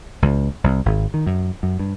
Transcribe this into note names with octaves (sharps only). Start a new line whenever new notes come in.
C#2
C2
G#1
D#3
F#2
F#2
G2